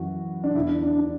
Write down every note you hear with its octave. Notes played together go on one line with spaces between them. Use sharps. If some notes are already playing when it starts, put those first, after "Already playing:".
Already playing: F#2 E3 F#4
D4
E2 D3 E4
D4
D4
D4